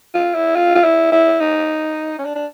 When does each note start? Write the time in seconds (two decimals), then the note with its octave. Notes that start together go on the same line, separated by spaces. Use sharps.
0.14 F4
0.35 E4
0.56 F4
0.75 F4
0.84 E4
1.12 E4
1.41 D#4
2.19 C#4
2.25 D4
2.36 D4